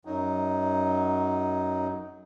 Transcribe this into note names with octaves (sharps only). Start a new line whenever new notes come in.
F#2 F#3 D#4